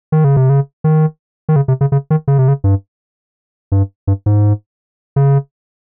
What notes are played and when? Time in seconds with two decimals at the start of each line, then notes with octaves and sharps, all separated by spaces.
0.12 D#3
0.24 C#3
0.36 C3
0.50 C#3
0.84 D#3
1.49 D#3
1.56 C#3
1.68 C3
1.81 C#3
1.92 C#3
2.10 D#3
2.28 C#3
2.38 C3
2.48 C#3
2.64 G2
3.72 G2
4.07 G2
4.26 G#2
5.16 C#3